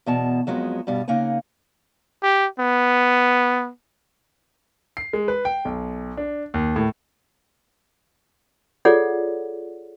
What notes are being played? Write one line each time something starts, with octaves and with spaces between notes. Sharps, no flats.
E2 B2 A5
F2 F#3 G#3 B3
G2 B2 G3
C#3 A#3 D#4 F#5 G#5
G4
B3
C7
G#3
B4
G5
B1
D4
D#2
A2
F4 G#4 A4 C#5 D5 F#5